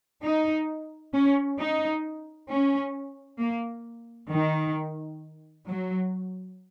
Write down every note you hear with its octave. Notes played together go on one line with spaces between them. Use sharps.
D#4
C#4
D#4
C#4
A#3
D#3
F#3